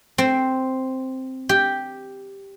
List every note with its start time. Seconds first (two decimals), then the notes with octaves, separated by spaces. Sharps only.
0.18 C4
1.49 G4